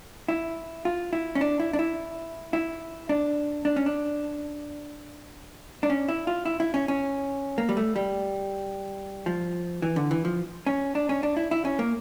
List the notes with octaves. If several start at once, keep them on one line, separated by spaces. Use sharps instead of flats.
E4
F4
E4
C#4
D4
E4
D4
E4
E4
D4
D4
C#4
D4
D4
C#4
E4
F4
E4
E4
C#4
C#4
A#3
G3
A3
G3
F3
E3
D3
E3
F3
C#4
D4
C#4
D4
E4
E4
C#4
A#3